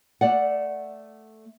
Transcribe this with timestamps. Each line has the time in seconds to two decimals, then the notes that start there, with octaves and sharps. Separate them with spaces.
0.21 A3 D5 F#5